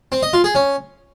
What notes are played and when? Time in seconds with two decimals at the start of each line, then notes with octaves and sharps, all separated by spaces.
0.12 C4
0.23 D#5
0.33 F4
0.44 G#4
0.55 C#4